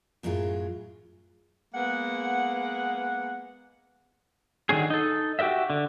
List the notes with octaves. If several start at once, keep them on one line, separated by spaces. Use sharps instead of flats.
F#2 A2 F#3 F4 G#4
G#3 A#3 B3 F#5
D3 D#3 F#3 C#4 G#4
D#4 A4
F#4 G4 A#4 D#5 E5
D3